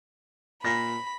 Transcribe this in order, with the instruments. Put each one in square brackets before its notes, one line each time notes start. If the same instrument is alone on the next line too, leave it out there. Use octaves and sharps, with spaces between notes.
[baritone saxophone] A#2 [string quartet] B5 [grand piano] A#6